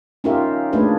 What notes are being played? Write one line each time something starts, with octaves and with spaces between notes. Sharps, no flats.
C#4 D#4 F4 G4 A#4 E5
A3 A#3 D4 G#4 B4